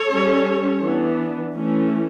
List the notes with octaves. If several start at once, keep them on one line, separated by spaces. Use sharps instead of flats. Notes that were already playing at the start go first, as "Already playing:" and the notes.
Already playing: A4 C#5
G3 C#4
E3 B3 D4
E3 A3 C#4